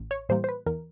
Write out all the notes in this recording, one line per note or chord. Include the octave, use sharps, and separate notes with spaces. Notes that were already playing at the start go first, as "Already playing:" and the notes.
Already playing: A1
C#5
A2 E3 G3 A#3 C5
C5
B4
E2 A#4